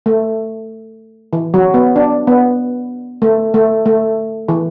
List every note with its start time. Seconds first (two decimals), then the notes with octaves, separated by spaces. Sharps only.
0.06 A3
1.33 E3
1.54 F#3
1.74 B3
1.96 D4
2.27 B3
3.22 A3
3.54 A3
3.86 A3
4.48 E3